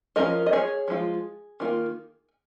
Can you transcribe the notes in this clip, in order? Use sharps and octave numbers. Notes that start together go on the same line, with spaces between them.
F3 C#4 F4 A#4 D#5
D#5
G#4 C#5
F3 G#3 F4
D#3 A#3 F4